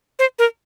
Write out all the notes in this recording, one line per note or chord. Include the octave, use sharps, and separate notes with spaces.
C5
A#4